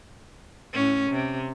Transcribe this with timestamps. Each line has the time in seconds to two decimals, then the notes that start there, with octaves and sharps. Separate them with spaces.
0.73 A2 C#4
1.11 C3